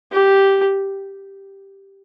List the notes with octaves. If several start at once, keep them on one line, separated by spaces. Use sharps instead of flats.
G4